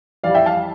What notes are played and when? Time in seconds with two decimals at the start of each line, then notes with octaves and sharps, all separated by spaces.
0.24 F2 E3 G3 D5 F5
0.34 E5 G5
0.46 F5 A5